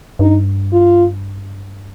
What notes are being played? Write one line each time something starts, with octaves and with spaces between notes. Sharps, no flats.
G2 D#4
F4